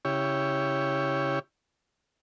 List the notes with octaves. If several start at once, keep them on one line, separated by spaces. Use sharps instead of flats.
C#3 E4 G4 C#5